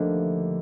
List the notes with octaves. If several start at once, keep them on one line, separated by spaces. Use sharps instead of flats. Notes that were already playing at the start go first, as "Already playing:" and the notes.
Already playing: D#2 D3 F3 A3